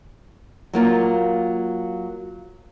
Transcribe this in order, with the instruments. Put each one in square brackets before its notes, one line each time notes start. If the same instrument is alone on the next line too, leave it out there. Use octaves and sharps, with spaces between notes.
[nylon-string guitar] F#3 A#3 F4